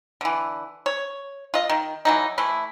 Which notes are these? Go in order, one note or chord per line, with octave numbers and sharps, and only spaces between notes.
D3 E3
C#5
F4 D#5
D#3
E3 F#3 D#4
E3 A3 E4